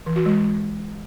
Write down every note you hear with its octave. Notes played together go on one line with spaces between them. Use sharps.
E3
F#4
G#3